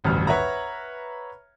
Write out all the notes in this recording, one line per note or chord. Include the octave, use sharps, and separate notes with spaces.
D#1 A1 D2 G2 F6
B4 C#5 E5 F#5 A#5